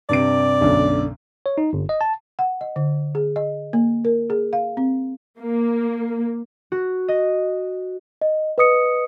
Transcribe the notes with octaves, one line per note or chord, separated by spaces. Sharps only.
G2 C3 D5 D7
B1 F#2 D3
C#5
D#4
G1
D#5
A5
F#5
D#5
D3
G#4
D#5
A#3
A#4
G#4
F5
C4
A#3
F#4
D#5
D#5
B4 D#5 D#6 C#7